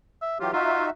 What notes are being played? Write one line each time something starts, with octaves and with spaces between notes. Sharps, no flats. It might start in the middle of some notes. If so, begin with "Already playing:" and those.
E5
E3 F#3 F4 G4
D#4 F4 F#4 E5